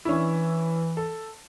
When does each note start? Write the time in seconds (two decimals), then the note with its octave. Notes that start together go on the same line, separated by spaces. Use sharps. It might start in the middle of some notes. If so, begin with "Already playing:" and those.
0.05 E3 C#4 D4 E4
0.97 A4